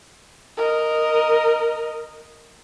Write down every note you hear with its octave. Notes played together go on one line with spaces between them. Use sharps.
A#4 D#5